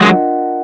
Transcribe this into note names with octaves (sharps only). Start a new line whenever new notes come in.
F#3 G#3 D4 F4 A#4 D#5 F#5